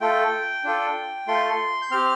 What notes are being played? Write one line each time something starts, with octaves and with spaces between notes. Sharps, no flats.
A3 F4 A4 G5
D4 F4 A4
A3 F4 A4 C6
G6
C4 G4 F6